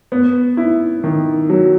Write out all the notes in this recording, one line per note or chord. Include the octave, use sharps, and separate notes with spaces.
B3
E4
D#3
F#3